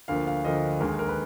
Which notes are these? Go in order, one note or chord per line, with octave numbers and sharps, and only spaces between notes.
D2 D3 F3 A#3 F5
F5
D2 D3 F3 A#3 D#5
D#2 D3 G#3 A#4
A#4
B4